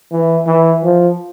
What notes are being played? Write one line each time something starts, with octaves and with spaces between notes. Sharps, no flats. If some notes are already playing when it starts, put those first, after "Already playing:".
E3
E3
F3